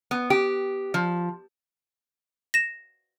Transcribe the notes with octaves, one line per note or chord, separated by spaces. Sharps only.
B3
G4
F3
A#6 E7